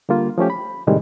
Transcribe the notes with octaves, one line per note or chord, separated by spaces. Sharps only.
D3 G3 A#3 F4
F3 A3 C#4 G4
B5
A2 C3 D#3 G3 G#3